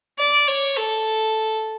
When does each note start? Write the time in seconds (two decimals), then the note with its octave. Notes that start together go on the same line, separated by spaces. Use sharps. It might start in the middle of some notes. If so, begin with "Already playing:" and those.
0.19 D5
0.48 C#5
0.77 A4